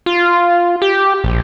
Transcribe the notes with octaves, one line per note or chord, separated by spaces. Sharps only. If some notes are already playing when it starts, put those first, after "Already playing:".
F4
G4
A#1